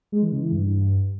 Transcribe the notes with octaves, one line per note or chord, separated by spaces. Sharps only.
G#3
E3
C#3
E3
G2